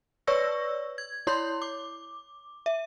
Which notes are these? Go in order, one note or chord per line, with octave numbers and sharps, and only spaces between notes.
B4 C#5 D5 C#6 E6 A#6
G#6
E4 C#5 C6 G6
D6
E5